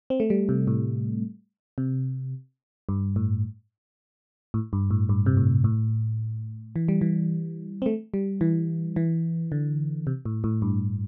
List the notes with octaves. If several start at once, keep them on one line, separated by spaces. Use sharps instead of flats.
C4
A3
G3
C3
A2
C3
G2
A2
A2
G2
A2
G2
C3
A2
A2
E3
G3
E3
C4
A3
G3
E3
E3
D3
C3
A2
A2
G2